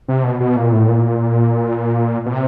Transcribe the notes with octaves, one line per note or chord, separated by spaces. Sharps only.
C3
B2
B2
A#2
A2
A#2
B2
C3